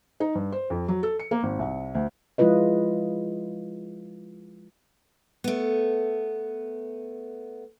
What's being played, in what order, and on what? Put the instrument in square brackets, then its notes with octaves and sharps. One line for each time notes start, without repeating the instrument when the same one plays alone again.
[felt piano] D#4
G2
C5
F2
F#3
A4
C#7
A#3
G#1
C2
D2
[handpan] F3 G#3 E4 F4 B4 D#5
[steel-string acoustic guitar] A3 B3